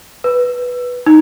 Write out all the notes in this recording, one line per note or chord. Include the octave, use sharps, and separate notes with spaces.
B4
D#4